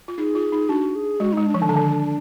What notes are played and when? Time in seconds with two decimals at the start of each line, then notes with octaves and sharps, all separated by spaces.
0.08 F4
0.17 D#4 G#4
0.35 F4
0.52 D#4
0.69 D4 F#4
0.95 G#4
1.20 G#3 F#4
1.33 D#4
1.38 G#3
1.46 D4
1.54 F3
1.59 D#4
1.62 D#3 D4
1.69 D3
1.76 D#3